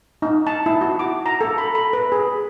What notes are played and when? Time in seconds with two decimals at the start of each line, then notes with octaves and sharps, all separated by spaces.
0.22 D#4
0.47 A5
0.66 E4
0.81 F#4
0.99 D6
1.26 A#5
1.41 A4
1.58 B5
1.75 B5
1.93 B4
2.12 G#4